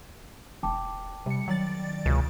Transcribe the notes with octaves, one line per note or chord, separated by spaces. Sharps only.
E1 G5 A5 D6
C3 G3 C#7
D#3 F#3 D5 A6
C#2 B2